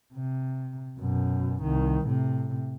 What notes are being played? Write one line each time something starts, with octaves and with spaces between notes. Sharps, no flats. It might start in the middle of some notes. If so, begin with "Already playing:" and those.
C3
F#2 B2
C2 D#3
A2 C3